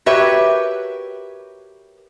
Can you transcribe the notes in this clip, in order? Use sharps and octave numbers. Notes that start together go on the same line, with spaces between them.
F#4 G4 A#4 B4 C#5 E5